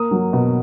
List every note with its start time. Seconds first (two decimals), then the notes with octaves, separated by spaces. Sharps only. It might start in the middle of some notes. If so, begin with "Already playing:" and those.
Already playing: A#3 D#6
0.11 F#3
0.33 B2